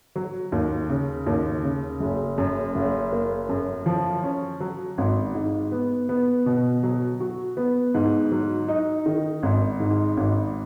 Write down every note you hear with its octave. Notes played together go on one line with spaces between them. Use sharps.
F#3
D#2
C#3
D#2
C#3
F#1
F#2
F#1
A#3
F#2
F3
C#4
F#3
G#1
G#2
B3
B3
B2
F#3
F#4
B3
G#2
F#3
D#4
D#3
G#1
G#2
G#1